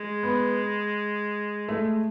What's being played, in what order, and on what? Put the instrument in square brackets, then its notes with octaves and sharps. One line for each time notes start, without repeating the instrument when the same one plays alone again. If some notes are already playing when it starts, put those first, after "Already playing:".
Already playing: [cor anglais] G#3
[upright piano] B3
A3